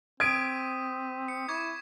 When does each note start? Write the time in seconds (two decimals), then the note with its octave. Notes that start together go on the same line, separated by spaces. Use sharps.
0.20 C4 D#6 G#6 B6 D7 D#7
1.28 C#7
1.49 E4 C#6 D6 G#6